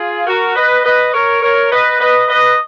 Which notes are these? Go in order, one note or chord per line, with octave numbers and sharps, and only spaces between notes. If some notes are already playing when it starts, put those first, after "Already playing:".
Already playing: F4 G#4
F#4 A#4
B4 D#5
B4 D#5
A#4 C#5
A#4 C#5
B4 D#5
B4 D#5
B4 D#5